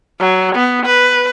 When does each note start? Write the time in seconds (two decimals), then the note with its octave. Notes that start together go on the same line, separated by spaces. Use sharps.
0.19 F#3
0.55 B3
0.86 B4